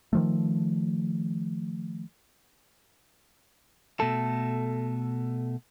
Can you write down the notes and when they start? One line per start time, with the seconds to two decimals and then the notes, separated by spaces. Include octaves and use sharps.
0.13 D#3 F3 A3
4.00 B2 A3 A4